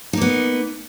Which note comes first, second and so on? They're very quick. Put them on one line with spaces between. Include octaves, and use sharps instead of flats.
D#4 A#3 B3